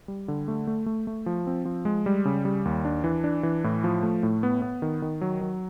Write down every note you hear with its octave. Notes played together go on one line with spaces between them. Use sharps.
G3
D3
A3
A3
A3
A3
F3
C4
F3
G#3
G3
C#3
G3
D#2
D4
E3
D4
E3
A2
F3
A3
A2
B3
B3
D#3
D#3
F#3
F#3